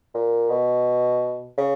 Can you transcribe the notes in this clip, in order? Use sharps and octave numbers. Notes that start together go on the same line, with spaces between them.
A#2
B2
C#3